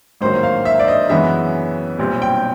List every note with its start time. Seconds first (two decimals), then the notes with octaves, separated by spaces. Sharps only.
0.21 A1 G#2 D#3 F#3 A#3 C5
0.43 F5
0.65 E5
0.79 D5
0.88 D#5
1.09 F#2 C#3 E3 G#3 B3 E5
1.98 B1 A#2 G3 C4
2.22 G5